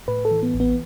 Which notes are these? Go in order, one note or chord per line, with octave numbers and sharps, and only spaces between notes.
A2 B4
A4
E3
B3
A1
B3